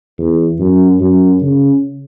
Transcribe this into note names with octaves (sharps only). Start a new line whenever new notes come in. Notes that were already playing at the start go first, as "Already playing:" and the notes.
E2
F#2
F#2
C#3